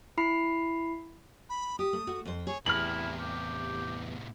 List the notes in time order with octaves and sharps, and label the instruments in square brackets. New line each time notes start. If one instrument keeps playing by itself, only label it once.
[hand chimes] E4 B5 C7
[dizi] B5
[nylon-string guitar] G4 [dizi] D#6
[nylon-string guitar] A3
A3 F#4
F2 C5
[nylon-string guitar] G#4 [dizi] C#5
[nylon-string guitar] E2 [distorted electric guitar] A2 C3 [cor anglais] E4 [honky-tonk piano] F6 F#7
[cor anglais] G4